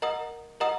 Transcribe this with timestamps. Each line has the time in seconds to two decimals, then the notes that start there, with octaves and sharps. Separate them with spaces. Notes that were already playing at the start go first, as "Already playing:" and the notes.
0.02 A#4 D#5 F#5 A#5 D#6
0.60 A#4 D#5 F#5 A#5 D#6